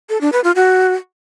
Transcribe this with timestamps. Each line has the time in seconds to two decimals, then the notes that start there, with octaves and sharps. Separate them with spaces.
0.09 A4
0.21 D4
0.33 B4
0.44 F4
0.56 F#4